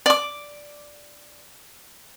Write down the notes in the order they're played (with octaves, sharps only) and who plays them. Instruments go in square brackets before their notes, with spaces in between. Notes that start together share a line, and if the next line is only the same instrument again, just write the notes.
[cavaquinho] D5 D6